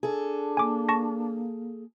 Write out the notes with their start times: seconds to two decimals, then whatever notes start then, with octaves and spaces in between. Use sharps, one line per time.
0.03 D4 G#4 A4
0.57 A#3 G#5 D6
0.89 A5 C#6 A#6